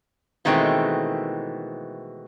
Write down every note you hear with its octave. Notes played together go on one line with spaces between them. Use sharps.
B2 D#3 E3 G#3 A3 C4